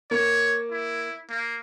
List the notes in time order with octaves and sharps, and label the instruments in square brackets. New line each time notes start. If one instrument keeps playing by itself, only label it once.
[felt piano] A#3 [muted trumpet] C#5
[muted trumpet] E4
A#3